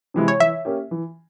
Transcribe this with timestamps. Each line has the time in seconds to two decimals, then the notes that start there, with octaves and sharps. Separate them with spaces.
0.14 C3 E3 G#3 E4
0.28 C#5
0.40 E3 E5
0.65 A#3 C#4 G4
0.91 E3